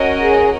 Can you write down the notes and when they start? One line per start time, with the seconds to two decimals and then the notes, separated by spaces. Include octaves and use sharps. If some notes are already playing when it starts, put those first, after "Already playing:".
Already playing: C#4 F#4 A#4 D#5
0.22 G#4